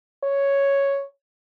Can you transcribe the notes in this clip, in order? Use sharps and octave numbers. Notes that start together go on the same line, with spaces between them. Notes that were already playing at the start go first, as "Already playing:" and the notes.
C#5